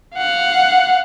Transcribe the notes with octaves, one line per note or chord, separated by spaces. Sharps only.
F5 F#5